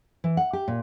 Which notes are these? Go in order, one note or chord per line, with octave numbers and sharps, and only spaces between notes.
E3
F#5
G4
A#2